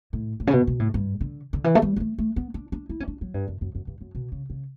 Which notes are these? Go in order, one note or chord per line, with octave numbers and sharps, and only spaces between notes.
A2
A2
C#3
B2
B2
A2
G2
D3
D3
E3
A3
G3
G3
A3
A3
B3
D4
D4
E4
C#4
D4
F#3
G2
F#2
F#2
F#2
G2
F#2
B2
C#3
C#3